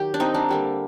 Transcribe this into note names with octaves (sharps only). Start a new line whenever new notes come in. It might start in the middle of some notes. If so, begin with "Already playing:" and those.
Already playing: D#3 F#3 G4
D4
C4 D#4
D4
D3 G3 A#3